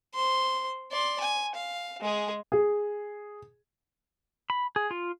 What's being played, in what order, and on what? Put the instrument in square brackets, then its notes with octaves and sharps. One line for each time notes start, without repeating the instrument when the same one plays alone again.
[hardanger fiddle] C5 C6
D5 C6
G#5
F5
G#3 G#4
[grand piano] G#4
[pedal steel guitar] B5
G#4
F4